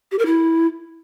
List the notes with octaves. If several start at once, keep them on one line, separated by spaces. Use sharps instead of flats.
G4
A#4
E4